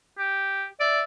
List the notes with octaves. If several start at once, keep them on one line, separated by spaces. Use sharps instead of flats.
G4
D5 E5